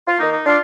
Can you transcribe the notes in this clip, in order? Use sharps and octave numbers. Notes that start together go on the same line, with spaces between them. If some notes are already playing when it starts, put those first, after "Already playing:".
F4
D#3 A#3 D#4
D#4
D4 F4